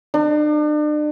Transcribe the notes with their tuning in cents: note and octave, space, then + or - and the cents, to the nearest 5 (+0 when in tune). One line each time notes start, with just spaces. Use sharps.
D4 +40